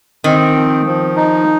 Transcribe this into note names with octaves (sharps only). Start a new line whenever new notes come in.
D#3 C4
F3
F3
D#4